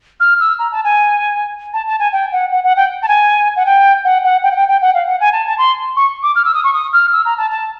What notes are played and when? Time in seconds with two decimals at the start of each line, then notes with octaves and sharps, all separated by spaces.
0.20 F6
0.40 E6
0.59 A#5
0.71 A5
0.84 G#5
1.73 A5
1.87 A5
1.99 G#5
2.12 G5
2.32 F#5
2.51 F#5
2.64 F#5
2.76 G5
3.02 A5
3.08 G#5
3.56 F#5
3.66 G5
4.04 F#5
4.23 F#5
4.43 G5
4.51 F#5
4.56 G5
4.68 G5
4.81 F#5
4.94 F5
5.07 F#5
5.20 G#5
5.32 A5
5.45 A5
5.58 C6
5.96 C#6
6.22 D6
6.35 F6
6.45 E6
6.54 D#6
6.64 C#6
6.73 D#6
6.93 F6
7.12 E6
7.25 A#5
7.37 A5
7.51 A5